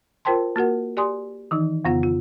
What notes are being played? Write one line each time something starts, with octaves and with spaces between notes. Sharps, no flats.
F4 A#4 C5 G5 A5 C6
A#3 F#4 A#4 F#5
G4 D5 G#5 C6 D#6
D#3 E3 D#4
F2 C#3 B3 F4 F#5
F4